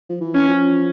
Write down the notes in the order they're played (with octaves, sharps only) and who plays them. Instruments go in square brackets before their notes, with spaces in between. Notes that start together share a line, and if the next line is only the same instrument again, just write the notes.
[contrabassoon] F3
E3
[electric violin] C#4
[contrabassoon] F3